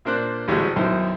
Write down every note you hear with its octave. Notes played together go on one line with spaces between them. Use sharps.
A#2 A#3 D4 C5 F#6
A1 D2 A2 G3 G#3
B1 F#2 B2 D#3 E4 C5